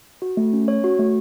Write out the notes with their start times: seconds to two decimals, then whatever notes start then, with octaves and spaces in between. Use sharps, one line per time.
0.22 F#4
0.37 A3
0.53 C#4
0.68 C#5
0.84 F#4
0.99 A3